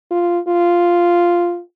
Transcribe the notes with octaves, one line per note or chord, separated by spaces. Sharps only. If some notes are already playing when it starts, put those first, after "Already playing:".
F4
F4